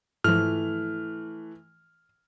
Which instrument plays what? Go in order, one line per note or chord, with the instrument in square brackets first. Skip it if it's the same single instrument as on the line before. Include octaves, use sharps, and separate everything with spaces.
[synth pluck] G#2 F3 [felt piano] E3 A3 [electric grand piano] F6